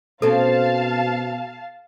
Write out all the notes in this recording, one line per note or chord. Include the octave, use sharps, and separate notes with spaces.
B2 C4 C#4 A4 F5 A5